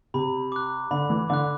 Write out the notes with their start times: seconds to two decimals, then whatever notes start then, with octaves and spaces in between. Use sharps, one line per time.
0.14 C3 B5
0.52 D6 F#6
0.91 D3 B5
1.10 E3
1.30 D3 D6 F#6